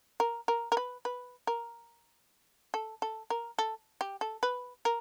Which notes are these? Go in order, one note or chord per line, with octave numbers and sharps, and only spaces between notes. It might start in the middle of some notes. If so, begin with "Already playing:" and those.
A#4
A#4
A#4
B4
B4
A#4
A4
A4
A#4
A4
G4
A4
B4
A#4